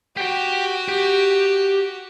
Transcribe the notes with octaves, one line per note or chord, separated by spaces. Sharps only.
F#4 G4 G5
G4